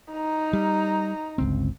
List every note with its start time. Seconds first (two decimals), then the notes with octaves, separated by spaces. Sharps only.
0.11 D#4 A#5
0.53 G3
1.38 G1 C#2 C4